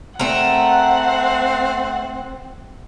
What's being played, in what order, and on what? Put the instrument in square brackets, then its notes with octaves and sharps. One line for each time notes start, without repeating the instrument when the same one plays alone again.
[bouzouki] A3 A#4 [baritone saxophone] C4 [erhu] F#5